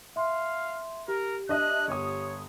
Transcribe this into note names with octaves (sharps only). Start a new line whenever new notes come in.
E5 F5 C6
G4 A#4
D4 D#5 E5 F#6
G1 C#5 D#6